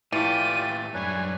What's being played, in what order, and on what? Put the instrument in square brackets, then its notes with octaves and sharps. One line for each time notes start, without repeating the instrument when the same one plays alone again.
[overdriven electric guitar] A2 G4 [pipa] E3 A3 [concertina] F4 D5 G5 [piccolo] D#7
[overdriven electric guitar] F#2 G3 [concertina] D4 B4 C#5 [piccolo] G#5